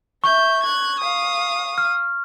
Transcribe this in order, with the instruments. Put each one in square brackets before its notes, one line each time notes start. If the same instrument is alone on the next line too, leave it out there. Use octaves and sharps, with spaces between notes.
[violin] E5 G6 [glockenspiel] C#6
[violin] F#6 G#6
F5 D#6
[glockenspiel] F6